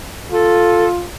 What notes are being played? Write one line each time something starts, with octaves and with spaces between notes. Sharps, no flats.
F4 A4